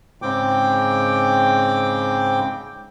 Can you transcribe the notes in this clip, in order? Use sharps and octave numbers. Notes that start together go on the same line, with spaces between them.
G#2 C#3 C4 G5 D6